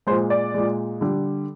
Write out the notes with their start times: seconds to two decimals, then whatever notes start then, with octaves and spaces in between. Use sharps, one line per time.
0.07 G#3 C5
0.11 A#2
0.30 D5
0.54 A#2 G#3
1.01 D3 G3